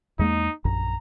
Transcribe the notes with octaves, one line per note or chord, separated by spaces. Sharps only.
E2 G#3 A#3 D#4
A#1 F#2 A#5